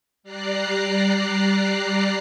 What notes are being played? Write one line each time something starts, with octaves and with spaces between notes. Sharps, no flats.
G3 D5 A#5 F#6 C7